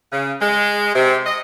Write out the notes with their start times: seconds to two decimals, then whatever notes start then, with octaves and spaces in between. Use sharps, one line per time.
0.12 C#3
0.41 G#3
0.94 C3
1.25 D#5